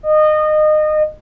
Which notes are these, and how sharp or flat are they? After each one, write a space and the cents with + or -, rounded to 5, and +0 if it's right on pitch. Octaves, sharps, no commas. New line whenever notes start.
D#5 -25